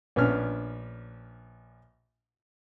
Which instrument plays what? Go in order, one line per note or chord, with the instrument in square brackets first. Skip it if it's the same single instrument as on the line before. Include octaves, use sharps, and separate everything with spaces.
[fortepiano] A#1 B3 C#4 D4 F6